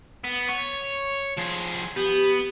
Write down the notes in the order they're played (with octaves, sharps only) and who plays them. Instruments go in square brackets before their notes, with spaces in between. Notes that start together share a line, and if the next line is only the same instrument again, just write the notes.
[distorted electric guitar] B3
C#5
F3 G#4
[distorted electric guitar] B3 [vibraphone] G4